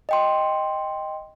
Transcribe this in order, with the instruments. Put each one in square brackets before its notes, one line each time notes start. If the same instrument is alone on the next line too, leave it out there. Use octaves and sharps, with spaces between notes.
[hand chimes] D#5 G5 C6